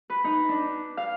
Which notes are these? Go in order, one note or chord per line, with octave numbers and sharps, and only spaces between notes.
B4
D#4
D4
F5